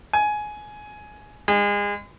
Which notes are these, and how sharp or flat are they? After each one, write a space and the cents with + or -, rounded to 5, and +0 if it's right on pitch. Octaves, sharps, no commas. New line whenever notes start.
G#5 +15
G#3 -30